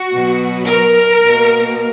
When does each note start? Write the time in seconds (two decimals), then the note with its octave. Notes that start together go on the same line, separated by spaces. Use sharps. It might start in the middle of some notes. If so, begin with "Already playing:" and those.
Already playing: F#4
0.12 B2 F#3 B3
0.69 A#4
1.24 B2 A#3